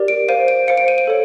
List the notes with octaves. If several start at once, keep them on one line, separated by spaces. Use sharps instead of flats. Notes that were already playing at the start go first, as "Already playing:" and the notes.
Already playing: G4 A#4 D5
D7
C5 F5 D#7
D7
C5 F5 C#7
D7
D#7
D7
A4 C#5